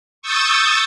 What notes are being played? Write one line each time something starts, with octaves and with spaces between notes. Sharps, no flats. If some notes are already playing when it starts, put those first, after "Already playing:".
C#6 D#6 E6 G6 A6